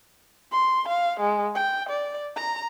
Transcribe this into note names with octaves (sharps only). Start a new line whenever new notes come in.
C6
F5
G#3
G5
D5
A#5